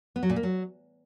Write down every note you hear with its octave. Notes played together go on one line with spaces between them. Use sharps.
B3
F#3
A#2
A#3
F#3